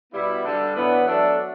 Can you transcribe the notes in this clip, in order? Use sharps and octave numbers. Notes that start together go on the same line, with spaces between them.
B2 G3 B3 E4
G2 D3 G3 D4 A4
A2 E3 B3 D4
F#3 A3 D4 A4